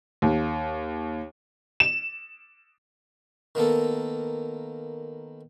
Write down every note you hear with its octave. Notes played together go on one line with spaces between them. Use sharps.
D#2
E7
D#3 A#3 B3 A4